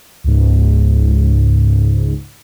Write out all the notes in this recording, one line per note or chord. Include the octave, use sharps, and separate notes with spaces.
C#2 G#2